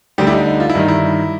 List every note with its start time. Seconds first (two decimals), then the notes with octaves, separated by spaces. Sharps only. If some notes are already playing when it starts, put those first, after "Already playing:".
0.18 D2 D3 G3 G4
0.27 E4
0.33 D#4
0.46 D#4
0.60 F4
0.70 E4
0.75 G2 D#3 G3 D#4
0.88 E4